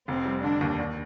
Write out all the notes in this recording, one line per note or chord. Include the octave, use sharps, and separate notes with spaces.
F1 C4
G3
D3 D4
D#2
D#2